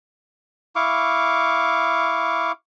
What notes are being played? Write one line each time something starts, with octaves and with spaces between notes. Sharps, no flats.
E4 F5 C#6 D6